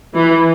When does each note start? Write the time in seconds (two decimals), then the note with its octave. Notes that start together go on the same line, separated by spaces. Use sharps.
0.15 E3